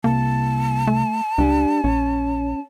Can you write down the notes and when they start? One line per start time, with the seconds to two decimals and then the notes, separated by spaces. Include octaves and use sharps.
0.04 C2 A#3 A5
0.87 A3
1.38 C#2 D4 G4
1.84 A#1 C#4